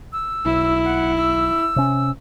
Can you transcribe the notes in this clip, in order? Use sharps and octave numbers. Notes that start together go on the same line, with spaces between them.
E6
B1 E4
F#5
E6
C3 C#4